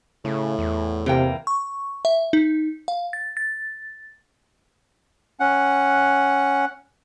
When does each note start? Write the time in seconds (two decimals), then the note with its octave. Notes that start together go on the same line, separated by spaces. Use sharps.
0.25 A2 C#3
0.59 E2
1.06 C3 E3 A#3 G5
1.47 C#6
2.05 E5
2.33 D#4
2.88 F5
3.13 A6
3.37 A6
5.40 C#4 F#5